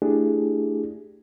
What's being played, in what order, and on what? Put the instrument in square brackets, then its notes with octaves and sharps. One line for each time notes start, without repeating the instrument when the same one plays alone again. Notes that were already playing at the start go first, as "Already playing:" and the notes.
[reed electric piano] A3 D4 E4 G4 G#4